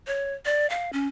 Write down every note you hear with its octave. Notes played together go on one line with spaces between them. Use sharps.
C#5
D5
F5
C#4